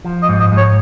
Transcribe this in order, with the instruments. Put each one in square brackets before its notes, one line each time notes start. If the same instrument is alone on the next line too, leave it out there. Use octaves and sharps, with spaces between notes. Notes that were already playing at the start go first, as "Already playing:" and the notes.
[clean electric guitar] F3
[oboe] D#5
[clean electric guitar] G#2
[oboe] D#5
[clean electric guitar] G#2
[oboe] C#5